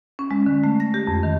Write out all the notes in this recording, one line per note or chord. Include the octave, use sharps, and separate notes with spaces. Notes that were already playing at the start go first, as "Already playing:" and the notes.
C#4
G#3
D3
A3
A#6
G4
F2
D#3